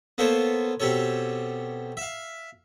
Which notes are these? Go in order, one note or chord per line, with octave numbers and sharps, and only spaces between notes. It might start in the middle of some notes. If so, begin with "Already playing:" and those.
A#3 B3 A4 C5 C#5
B2 C4 G4 A4 C#5
E5 F5